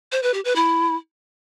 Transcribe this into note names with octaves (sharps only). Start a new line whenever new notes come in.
C5
B4
G4
B4
E4